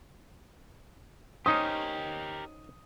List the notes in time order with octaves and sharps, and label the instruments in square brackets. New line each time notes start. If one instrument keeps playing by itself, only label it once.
[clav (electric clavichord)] C#4 D#4 C5 [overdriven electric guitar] G4 A#4 [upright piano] D#6